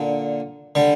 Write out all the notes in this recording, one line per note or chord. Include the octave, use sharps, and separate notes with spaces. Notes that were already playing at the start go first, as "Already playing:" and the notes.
Already playing: A#2 D3
D3 G3